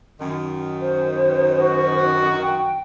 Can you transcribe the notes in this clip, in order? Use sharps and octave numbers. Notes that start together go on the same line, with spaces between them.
F#2 D#3
C5
F#4
G5